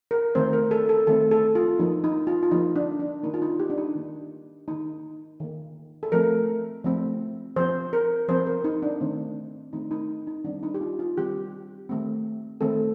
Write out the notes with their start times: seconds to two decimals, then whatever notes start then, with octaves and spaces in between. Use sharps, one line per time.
0.11 A#4
0.35 D#3 A3 C4 C5
0.53 A#4
0.71 A4
0.89 A4
1.07 D#3 A3 C4 A4
1.31 A4
1.55 F4
1.79 F3 A#3 D#4
2.04 D#4
2.27 F4
2.43 F4
2.51 F3 A#3 D#4
2.76 D4
3.00 D4
3.23 D#3 A#3 D#4
3.34 F4
3.42 D#4
3.59 G4
3.70 D4
3.78 D#4
3.95 D#3 A#3
4.68 D#3 A#3 D#4
5.40 D#3 A#3
6.03 A4
6.12 F3 A3 C4 A#4
6.84 F3 A3 C4
7.56 F3 C4 C5
7.93 A#4
8.28 F3 C4 C5
8.47 A#4
8.64 D#4
8.82 D4
9.01 D#3 A3 C4
9.73 D#3 A3 C4 D#4
9.91 D#4
10.27 D#4
10.45 D#3 G3 C4 D4
10.63 D#4
10.74 G4
10.81 F4
10.99 F4
11.17 D#3 G3 C4 G4
11.89 D#3 A3 C4
12.61 D#3 A3 C4 A4